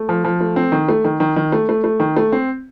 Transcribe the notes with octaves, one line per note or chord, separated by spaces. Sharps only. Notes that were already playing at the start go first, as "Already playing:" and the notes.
Already playing: A3
F3
F3
A3
C4
D#3
A3
D#3
D#3
D#3
A3
A3
A3
D#3
A3
C4